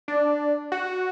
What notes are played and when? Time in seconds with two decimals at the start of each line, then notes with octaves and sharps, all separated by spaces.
0.08 D4
0.72 F#4